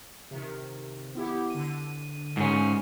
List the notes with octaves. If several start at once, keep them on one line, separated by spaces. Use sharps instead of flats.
C3 D#3
B3 E4 G4
D3 D#7
G#2 C#4